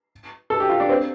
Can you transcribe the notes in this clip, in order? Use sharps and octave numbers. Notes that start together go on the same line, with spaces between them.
A4
G4
F4
D4
C4